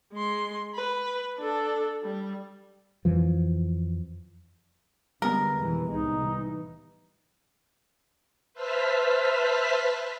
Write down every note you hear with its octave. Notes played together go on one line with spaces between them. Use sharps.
G#3 C6
B4
D4 A4
G3
F2 E3 F3
D3 G3 G#3 B3 A#4
F2 B2 E3
C2 A2 G#3 D#4
E3
B4 C5 E5 A5 F6 B6